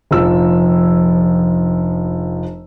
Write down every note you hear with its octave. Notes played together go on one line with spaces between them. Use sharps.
F1 A#1 F3 E6